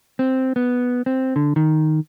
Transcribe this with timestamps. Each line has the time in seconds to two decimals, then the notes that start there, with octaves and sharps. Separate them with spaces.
0.19 C4
0.56 B3
1.06 C4
1.36 D3
1.56 D#3